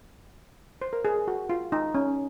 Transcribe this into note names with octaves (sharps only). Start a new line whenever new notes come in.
C5
A#4
G#4
F#4
F4
D#4
C#4